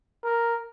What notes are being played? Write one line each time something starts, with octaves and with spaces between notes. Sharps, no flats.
A#4